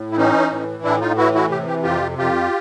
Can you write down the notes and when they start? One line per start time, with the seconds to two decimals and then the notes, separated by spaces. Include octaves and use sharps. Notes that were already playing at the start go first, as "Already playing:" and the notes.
Already playing: A2
0.12 E4
0.17 E3 C#4 D#4
0.50 A2
0.84 A2 D4 E4
1.01 D#4 F4
1.17 E3 E4 F#4
1.34 E4 F#4
1.50 C3 G4
1.67 G4
1.83 F2 F4 G4
2.18 F2 F4 G4